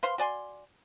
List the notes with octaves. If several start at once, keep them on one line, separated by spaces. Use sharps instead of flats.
B4 C5 F5 C6
F#4 D5 G#5 C6